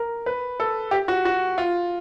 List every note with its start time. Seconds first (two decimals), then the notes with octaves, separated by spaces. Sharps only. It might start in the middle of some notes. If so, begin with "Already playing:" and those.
Already playing: A#4
0.26 B4
0.60 A4
0.91 G4
1.08 F#4
1.25 F#4
1.58 F4